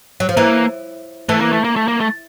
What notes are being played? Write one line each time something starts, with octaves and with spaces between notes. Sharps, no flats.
F#3
F3
E3 A#3
E3 A3
A#3
A3
A#3
A3
A#3
A3